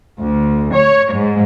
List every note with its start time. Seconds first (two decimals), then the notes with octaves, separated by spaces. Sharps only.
0.19 D2
0.74 C#5
1.14 G#2